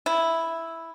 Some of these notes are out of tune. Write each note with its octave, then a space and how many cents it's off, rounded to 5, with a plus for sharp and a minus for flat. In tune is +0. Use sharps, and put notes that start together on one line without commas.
E4 +0